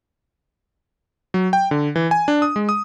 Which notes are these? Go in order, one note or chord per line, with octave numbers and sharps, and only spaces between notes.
F#3
G5
D3
E3
G#5
D4
D#6
G#3
D#6